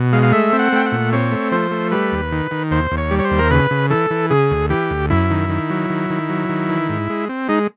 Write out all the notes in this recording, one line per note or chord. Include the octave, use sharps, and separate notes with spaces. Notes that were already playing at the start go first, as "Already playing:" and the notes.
Already playing: B2
G#3 F5
F5
A3 E5
C4
F#5
A3 G5
F#5
A#2
C4 C#5
A3
F3 C5
A3
G3 B4
D#2
D#3
D#3
D#2 C5
D#2
C#5
G3
C#5
C5
D#2
A#4
C#3 B4
C#3
E3 A4
E3
C#3 G#4
D2
E3 G4
D2
F#2 E4
D#3
D#3
F#3
D#3
D#3
F#3
D#3
E3
G#2
G#3
C4
G#3 D#4